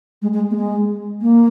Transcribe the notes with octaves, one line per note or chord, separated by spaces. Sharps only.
G#3
G#3
A#3
G#3
A#3